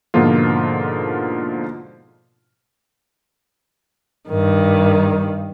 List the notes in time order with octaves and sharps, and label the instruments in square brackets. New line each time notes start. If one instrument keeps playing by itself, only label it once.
[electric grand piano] G#2 B2 D3 F3 A#3 F4
[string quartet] G2 D#3